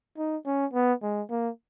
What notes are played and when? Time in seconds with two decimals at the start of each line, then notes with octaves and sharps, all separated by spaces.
0.17 D#4
0.46 C#4
0.73 B3
1.02 G#3
1.30 A#3